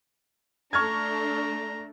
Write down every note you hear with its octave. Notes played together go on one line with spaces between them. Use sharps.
A3 D4 A#5 C#6 F6 G#6